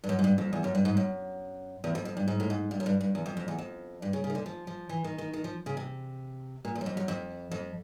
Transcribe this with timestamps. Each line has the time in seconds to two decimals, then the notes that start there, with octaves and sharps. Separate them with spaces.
0.04 G2
0.09 F#2
0.19 G#2
0.24 G2
0.38 F2
0.53 E2
0.64 F#2
0.75 G2
0.85 G#2
0.97 F#2
1.84 E2
1.95 F2
2.05 F2
2.17 G2
2.28 G#2
2.40 A2
2.50 G#2
2.71 G2
2.80 F#2
2.86 G2
3.01 G2
3.15 E2
3.26 F2
3.37 F2
3.48 E2
3.58 F2
4.02 G2
4.13 C#3
4.24 C#3
4.30 D#3
4.35 D3
4.46 F3
4.67 F3
4.89 E3
5.04 D#3
5.18 D#3
5.33 D#3
5.44 F3
5.66 C#3
5.77 C3
6.65 A#2
6.75 E2
6.81 F#2
6.86 F2
6.97 F#2
7.08 F2
7.51 F2